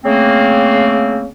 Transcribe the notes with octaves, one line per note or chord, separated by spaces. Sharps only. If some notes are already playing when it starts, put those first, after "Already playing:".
C#3 A3 A#3 C4